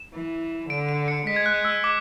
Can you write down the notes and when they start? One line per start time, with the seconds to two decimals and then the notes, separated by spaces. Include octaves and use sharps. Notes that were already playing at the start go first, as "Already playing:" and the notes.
Already playing: E7
0.14 E3
0.70 D3 D7
0.89 D7
1.08 C#7
1.27 G#3 B6
1.36 G#6
1.46 F#6
1.65 E6
1.84 D6